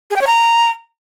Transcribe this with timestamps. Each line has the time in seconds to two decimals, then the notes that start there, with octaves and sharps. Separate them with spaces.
0.11 G#4
0.16 G5
0.21 C#5
0.27 A#5